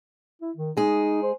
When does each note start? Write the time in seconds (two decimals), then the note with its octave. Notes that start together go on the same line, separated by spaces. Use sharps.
0.41 E4
0.56 D#3
0.77 G#3 D#4 G#4
1.23 C5